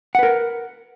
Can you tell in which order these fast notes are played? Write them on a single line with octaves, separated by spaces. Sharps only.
F#5 B4 A#4